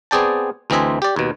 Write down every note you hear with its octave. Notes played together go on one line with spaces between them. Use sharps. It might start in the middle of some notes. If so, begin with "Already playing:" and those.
B3 C4 G#4 D5 G5 A5
D2 E3 C4 D#5 E5 G#5
G4 D5
D#2 B2